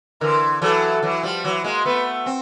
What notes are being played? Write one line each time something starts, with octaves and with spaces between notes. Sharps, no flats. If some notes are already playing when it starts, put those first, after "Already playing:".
D3 E3 A#4
E3 F#3 A4
E3 F#3
F3 G3
E3 F#3
G#3 A#3
A3 B3 B4
C4